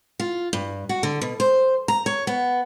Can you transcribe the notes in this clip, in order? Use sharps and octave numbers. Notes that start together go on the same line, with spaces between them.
F4
G2
F#4
D3
B2
C5
A#5
C#5
B3